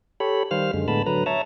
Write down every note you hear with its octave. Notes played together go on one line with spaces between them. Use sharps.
G4 A4 C#5 B5
D#3 G3 C5 F5 F6
F#2 D3 G#3
A2 D3 G#3 B3 A5 B5
D3 F#3 B4 A#5
C#5 E5 A5 A#5